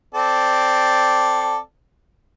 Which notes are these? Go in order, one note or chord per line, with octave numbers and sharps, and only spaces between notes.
C4 A4 D5